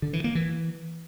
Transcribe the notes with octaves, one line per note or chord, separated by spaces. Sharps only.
D3
E3
A#3
E3